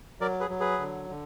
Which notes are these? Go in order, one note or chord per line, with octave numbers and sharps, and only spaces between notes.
F#3 A#4 D5
G#4 B4
F#3
G#4 B4
D3
D3